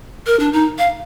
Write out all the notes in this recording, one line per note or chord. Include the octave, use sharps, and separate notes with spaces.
A#4
D4
D#4
F5